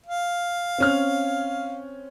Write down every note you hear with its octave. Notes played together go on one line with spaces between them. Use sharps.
F5
C4 C#4 F6